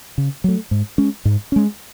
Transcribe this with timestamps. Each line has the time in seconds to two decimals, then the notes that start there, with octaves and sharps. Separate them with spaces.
0.18 C#3
0.44 F#3 A3
0.71 G#2
0.98 G#3 C#4
1.25 G#2
1.52 G#3 C#4